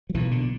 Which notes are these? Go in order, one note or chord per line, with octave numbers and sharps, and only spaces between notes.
F#3
B1 A#2 E3
D3